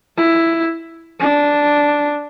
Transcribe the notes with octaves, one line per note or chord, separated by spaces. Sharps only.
E4
D4